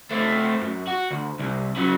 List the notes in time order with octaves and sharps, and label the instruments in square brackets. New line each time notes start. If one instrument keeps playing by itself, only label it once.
[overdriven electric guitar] A3 C4
F#2
F#4
D2
C2
C#3 F#3